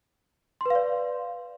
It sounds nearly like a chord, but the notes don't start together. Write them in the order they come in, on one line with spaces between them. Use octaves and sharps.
C6 B4 F5 D5